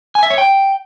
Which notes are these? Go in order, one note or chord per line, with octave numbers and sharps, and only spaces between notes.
G#5
E5
C#5
G5